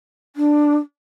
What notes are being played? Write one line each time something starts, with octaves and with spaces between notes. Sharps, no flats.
D4